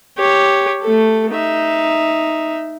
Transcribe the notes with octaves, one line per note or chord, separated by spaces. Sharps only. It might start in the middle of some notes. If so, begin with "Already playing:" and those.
G4 C#5
A3 A4
D#4 E5